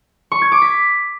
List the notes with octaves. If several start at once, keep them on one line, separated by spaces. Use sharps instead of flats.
C#6
G#6
D6
B6